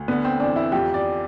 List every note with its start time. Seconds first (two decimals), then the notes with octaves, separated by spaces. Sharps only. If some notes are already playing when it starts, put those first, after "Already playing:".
Already playing: D2
0.08 D3 B3
0.25 C4
0.40 E2 D4
0.56 E4
0.72 F2 G4
0.94 D5